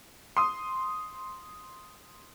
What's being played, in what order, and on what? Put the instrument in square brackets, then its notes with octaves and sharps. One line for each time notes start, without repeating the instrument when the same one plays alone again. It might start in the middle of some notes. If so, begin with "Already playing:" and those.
[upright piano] C6 D#6